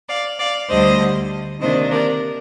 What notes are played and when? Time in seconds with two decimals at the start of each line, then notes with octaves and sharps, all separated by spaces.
0.08 D5 F5
0.39 D5 F5
0.69 D2 D3 G3 C5 D#5
1.61 C3 D#3 A#3 D4 C5 D#5
1.91 A#4 D5